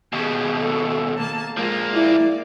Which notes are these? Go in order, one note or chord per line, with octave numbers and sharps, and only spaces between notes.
D#2 B2 G4 G#4
A4
A#3 A5
F3 G#3 A#3 F4
E4 D5